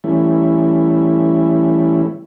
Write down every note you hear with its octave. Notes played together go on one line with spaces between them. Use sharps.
E3 G3 A3 C#4 E4